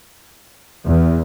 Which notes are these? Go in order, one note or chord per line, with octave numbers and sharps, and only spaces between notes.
E2